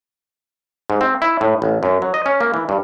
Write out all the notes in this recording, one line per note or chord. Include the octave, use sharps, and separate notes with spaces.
G#2
C4
E4
A2
A1
F#2
F#3
D#5
C#4
A#3
E3
G2